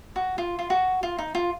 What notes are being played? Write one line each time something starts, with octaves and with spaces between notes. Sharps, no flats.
F#4
F4
F4
F#4
F4
D#4
F4